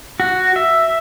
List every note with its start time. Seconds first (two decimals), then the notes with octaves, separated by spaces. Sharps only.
0.20 F#4
0.56 E5